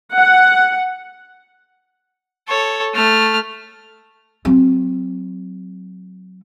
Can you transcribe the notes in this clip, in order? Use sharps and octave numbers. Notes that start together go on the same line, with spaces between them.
F#5
A4 C#5
A3 F6
F#3 C4